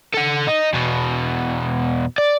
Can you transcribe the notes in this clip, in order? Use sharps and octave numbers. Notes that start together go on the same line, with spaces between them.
A4 F#5
D#4
E2 B2
D5